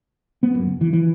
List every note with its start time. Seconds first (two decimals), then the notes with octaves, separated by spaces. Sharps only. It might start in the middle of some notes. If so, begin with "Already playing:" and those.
0.43 B3
0.55 F#2
0.68 F#1
0.81 E3
0.93 E3